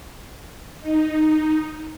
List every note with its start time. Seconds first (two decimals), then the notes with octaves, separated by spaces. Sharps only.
0.81 D#4